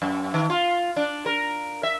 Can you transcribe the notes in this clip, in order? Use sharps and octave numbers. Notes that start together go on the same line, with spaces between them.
F#2
D#3
F4
D4
A#4
E5